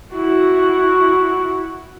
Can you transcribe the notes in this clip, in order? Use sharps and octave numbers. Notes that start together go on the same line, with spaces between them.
E4 F#4